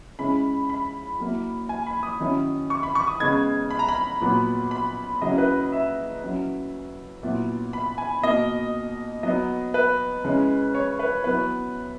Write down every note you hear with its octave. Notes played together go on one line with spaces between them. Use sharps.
C#3 G#3 C#4 E4 B5
B5
F#3 A#3 E4
G#5
B5
D#6
D#3 F#3 C#4 E4
C#6
B5
C#6
D#6
C#3 G#3 B3 D#4 G#6
B5
A#5
B5
A#2 F#3 B3
B5
C#3 F#3 C#4 E4 D#5
B4
E5
F#3 C#4 E4
A#2 F#3 B3 E4
B5
G#5
B2 A#3 D#4 D#5
F#3 B3 D#4 D#5
B4
C#3 G#3 C#4 E4
C#5
B4
F#3 B3 E4 B4